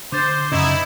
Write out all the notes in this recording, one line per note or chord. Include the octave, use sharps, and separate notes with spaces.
D3 C5 D6 G6 A6
F#2 C#3 D#4 E4 D#5 A#5